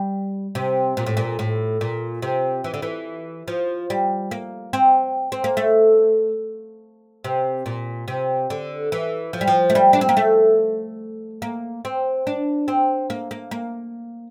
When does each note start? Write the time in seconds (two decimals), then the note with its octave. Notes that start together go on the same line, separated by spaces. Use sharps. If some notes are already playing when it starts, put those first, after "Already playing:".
Already playing: G3
0.55 C3
0.97 A#2
1.06 A2
1.17 A#2
1.39 A2
1.81 A#2
2.22 C3
2.64 E3
2.74 D3
2.82 E3
3.48 F3
3.90 G3
4.31 A#3
4.73 C4
5.32 C4
5.44 A#3
5.57 A3
7.24 C3
7.66 A#2
8.08 C3
8.50 D3
8.92 E3
9.33 F3
9.41 G3
9.48 F3
9.70 A3
9.75 G3
9.93 D4
10.01 C4
10.09 A#3
10.17 A3
11.42 A#3
11.85 C4
12.27 D4
12.68 C4
13.10 A#3
13.31 A#3
13.51 A#3